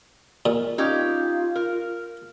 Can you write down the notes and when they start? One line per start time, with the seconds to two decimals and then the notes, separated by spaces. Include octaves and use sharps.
0.46 A#2
0.78 C#4 D#4 F4 G4
1.56 A#4